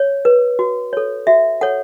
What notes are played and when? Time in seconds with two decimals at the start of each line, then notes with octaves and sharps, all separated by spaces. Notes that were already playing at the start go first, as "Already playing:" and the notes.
Already playing: C#5
0.25 B4
0.59 F#4
0.93 A4 C#5
1.27 F#4 E5
1.61 A4 C#5 F#5